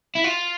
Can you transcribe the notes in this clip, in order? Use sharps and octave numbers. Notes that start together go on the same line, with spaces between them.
E4
F4